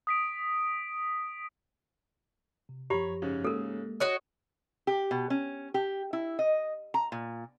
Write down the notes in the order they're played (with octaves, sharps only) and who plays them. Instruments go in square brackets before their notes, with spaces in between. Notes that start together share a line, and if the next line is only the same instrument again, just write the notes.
[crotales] D#6 B6 D7
[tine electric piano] C3
[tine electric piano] F#2 F3 [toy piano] G4 [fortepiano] C#5 A#5 B5
[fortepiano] G#2 C#3 C#4
[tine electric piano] G#3 A#3 [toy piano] A4 A#4
[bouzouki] F#4 C#5 D#5 [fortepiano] F#6
[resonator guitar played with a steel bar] G4
B2
C#4
G4
E4
D#5
A#5
A#2